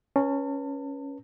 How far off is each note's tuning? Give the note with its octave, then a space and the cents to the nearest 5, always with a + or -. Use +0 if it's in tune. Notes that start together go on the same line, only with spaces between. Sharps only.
C#4 +0 B4 -25 A5 +35